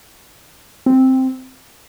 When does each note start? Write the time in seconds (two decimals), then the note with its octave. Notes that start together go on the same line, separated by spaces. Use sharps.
0.86 C4